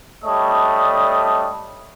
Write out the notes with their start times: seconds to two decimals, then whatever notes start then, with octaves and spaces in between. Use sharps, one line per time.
0.25 G3 A3 D4 C#5 D#5 D#6